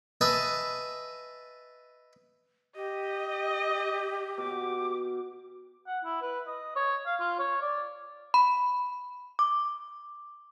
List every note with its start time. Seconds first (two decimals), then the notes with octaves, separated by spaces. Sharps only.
0.21 B4 D#5 E5 G#5 A5
2.76 G4 D#5
4.38 B2 D6
5.87 F#5
6.04 E4
6.21 B4
6.47 D#5
6.76 C#5
7.06 F5
7.20 F4
7.39 C#5
7.61 D5
8.34 B5
9.39 D6